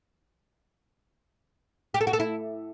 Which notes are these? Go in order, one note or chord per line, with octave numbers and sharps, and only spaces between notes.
G4
A4
F#4
A4
E4